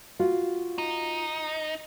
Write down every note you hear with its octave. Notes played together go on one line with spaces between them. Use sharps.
F4 F#4 F5
D#4